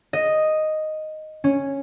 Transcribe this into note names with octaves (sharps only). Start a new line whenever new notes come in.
D#5
C#4